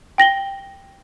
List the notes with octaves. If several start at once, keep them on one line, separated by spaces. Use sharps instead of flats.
G5 A#6 F#7 G7